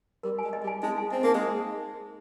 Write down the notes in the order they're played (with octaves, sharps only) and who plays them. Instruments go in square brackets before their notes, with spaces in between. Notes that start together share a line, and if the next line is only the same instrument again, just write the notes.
[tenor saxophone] G3 [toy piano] A#4
[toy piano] G#5
[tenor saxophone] G#3
[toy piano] D#5
[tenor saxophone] G3
[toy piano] G#5
[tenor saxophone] G#3 [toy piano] D#4
[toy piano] G#5
[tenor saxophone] C4 [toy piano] D#5
[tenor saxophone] A#3 [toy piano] D#4
[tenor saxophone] G#3